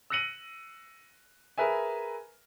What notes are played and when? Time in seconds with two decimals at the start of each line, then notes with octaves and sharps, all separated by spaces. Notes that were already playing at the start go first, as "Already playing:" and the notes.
0.10 E6 F#6 A#6 C#7 D#7 F#7
1.58 G#4 A#4 B4 E5 G#5